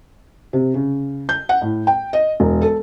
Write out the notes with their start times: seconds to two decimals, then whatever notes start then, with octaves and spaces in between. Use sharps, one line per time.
0.53 C3
0.74 C#3
1.29 G6
1.49 F#5
1.61 A2
1.87 G5
2.13 D#5
2.40 E1
2.61 A4